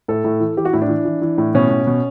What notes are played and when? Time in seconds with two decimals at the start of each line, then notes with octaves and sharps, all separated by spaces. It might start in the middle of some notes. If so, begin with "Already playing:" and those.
0.08 A2 A4
0.24 A2
0.40 E3
0.57 E3 G4
0.65 F#4
0.73 A2 E4
0.82 D4
0.89 E3
1.05 E3
1.22 E3
1.38 A2
1.55 B2 C#4
1.71 B2
1.87 B2